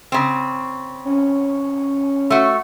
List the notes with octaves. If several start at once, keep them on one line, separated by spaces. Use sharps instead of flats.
C#3 C4
C#4
A3 F#4